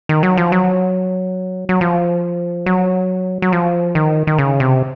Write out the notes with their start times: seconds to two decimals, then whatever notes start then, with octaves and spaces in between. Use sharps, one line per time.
0.09 D#3
0.23 F#3
0.37 F3
0.52 F#3
1.69 F#3
1.81 F3
2.66 F#3
3.42 F#3
3.52 F3
3.95 D#3
4.27 D#3
4.38 C#3
4.60 C3